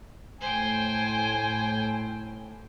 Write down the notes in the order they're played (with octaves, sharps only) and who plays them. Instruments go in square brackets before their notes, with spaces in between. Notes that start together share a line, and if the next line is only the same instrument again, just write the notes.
[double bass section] A2 [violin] C5 G5 [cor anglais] G#5